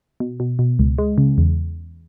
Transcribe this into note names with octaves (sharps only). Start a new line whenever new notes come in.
B2
B2
B2
C#2
G#3
C#3
E2